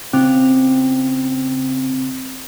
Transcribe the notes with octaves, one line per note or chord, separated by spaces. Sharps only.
C#3 C4 F4